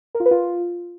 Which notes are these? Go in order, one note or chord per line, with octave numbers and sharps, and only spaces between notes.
A#4
F4
B4
F4